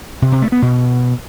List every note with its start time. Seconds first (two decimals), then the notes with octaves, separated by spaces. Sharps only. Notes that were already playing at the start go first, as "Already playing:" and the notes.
0.22 C3
0.32 C3
0.42 A3
0.52 B3
0.62 B2